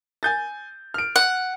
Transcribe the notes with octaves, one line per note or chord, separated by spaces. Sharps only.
G#5 G6 A6
F6 D7
F#5